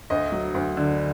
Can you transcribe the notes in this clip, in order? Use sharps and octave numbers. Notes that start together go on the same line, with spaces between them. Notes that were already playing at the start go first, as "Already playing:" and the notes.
D2 D#5
F#3
D2
D3